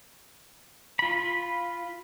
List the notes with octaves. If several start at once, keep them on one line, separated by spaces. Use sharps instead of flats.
F4 B5